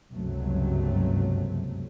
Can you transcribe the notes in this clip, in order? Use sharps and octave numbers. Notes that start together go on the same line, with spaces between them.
F#1 C#2 G2 C3 F#3 A3